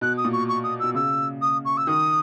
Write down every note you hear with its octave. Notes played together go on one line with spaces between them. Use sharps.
B2 F#6
D#6
A#2
C#6
C#6
D#6
B2 E6
C#3 E6
D#6
C#6
E6
D#3 D#6